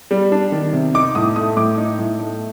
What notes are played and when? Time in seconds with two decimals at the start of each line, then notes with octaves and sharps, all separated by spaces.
0.11 G3
0.32 D4
0.52 D#3
0.73 C3
0.94 D#4 D6
1.15 A2 D#6
1.36 A3 D#6
1.57 A2 D6
1.77 D#4
1.99 A2
2.20 A3